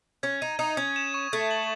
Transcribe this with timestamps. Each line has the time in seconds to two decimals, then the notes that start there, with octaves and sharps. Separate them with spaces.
0.23 C#4 G#6
0.41 D#4 D#7
0.59 D#4 D#6
0.77 C#4 G#6
0.96 E7
1.14 C#6
1.33 A3 G#6
1.51 F#7